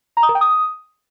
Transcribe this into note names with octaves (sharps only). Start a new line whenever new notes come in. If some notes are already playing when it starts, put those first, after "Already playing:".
A#5
D#6
A#4
G5
D#6